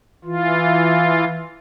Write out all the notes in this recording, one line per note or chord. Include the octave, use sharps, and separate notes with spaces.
E3 F4